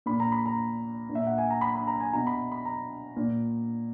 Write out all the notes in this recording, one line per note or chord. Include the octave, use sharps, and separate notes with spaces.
A#2 B5
A#5
B5
A#5
A#2
E5
F#5
G#5
A#5
B5
B5
A#5
G#5
B2 A#5
B5
B5
A#5
A#2